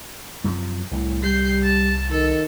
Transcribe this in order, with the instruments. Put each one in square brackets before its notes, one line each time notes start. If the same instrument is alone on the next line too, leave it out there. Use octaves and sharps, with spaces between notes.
[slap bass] F#2 C3 F3
[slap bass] C2 [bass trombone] A2
[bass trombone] G3 [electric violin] G6 C7
[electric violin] A5
[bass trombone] D#3 [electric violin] A4